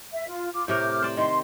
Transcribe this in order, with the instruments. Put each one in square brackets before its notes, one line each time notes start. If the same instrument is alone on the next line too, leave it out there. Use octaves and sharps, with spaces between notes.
[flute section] E5
F4
F4 D6
[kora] A2 C3 A#4 [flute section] D6 F6 G6
[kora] C5 D5 G5
[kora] D#3 [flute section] C6